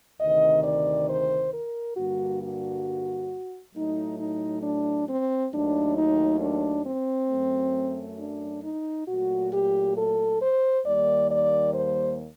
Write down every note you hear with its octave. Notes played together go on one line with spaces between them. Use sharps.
D2 C3 D#3 D#5
D5
C5
A#4
G2 D3 G3 A#3 F#4
F#4
A2 F#3 A3 D#4
D#4
D4
C4
D#2 D#3 F#3 A3 D4
D#4
D4
C4
F#2 F#3 A3
D4
D#4
A#2 F#3 A3 F#4
G4
A4
C5
D#2 D#3 G3 A#3 D5
D5
C5